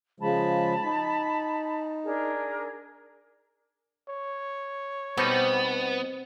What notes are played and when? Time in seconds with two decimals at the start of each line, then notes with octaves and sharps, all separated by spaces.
0.20 C#3 F3 G#3 A5 B5
0.84 D#4
2.03 D4 G#4 A#4
4.09 C#5
5.17 B2 G3 B3 C4 D#4